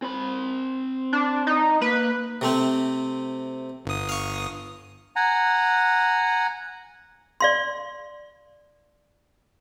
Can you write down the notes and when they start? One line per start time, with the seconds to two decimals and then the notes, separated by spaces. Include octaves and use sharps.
0.02 C4 B5
1.13 D4
1.47 D#4
1.81 A#3 B4
2.41 C3 A3 C4
3.86 G1 D#6
4.09 F5 C#6
5.16 F#5 G#5 A#5
7.41 D5 F5 C6